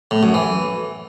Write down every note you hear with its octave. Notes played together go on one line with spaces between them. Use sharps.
A2
F#2
E3